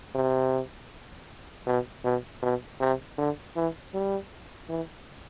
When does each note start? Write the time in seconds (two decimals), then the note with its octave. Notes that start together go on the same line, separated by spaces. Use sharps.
0.15 C3
1.67 B2
2.04 B2
2.42 B2
2.81 C3
3.18 D3
3.56 E3
3.94 G3
4.69 E3